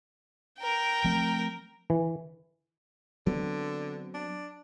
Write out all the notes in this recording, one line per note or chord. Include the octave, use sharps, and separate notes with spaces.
A#4 G5
F3 A3 C4
E3
D3 F#3 B3 C4
D4